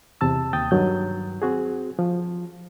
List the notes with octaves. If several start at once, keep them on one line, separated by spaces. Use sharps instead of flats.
E2 C3 A5 E6
D#2 G5 D#6 A6
G2 D#3 F#3 G6
C4 F#4 G#4
F3